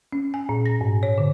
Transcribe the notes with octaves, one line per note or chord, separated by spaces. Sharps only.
C#4
G#5
A#2
A#6
G#2
C#5
D3